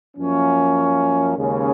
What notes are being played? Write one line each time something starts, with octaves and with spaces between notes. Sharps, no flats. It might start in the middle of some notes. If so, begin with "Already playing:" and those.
F#2 F3 A#3 C#4
D#2 C#3 G#3 C#4 G#4